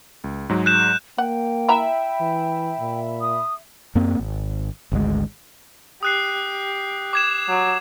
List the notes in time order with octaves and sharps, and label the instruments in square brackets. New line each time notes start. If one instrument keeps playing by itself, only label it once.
[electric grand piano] C#2
G#2 F#3 G#3
[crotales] F#6 G6 E7
[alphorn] A#3 [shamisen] F#5 [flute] G5
[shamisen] E4 F#5 A#5 [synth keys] E5 B5
[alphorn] E3
A#2
[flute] D#6
[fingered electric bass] F#2 A#3 C4
G#1
G#1 D2 G#3
[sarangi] G4 [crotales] D#6 F#6 C7
[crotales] D6 G#6 E7
[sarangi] F#3